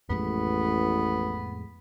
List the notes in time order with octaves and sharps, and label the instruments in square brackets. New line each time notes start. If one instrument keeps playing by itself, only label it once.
[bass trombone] A1 [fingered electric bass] F2 A2 G#3 [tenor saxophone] B3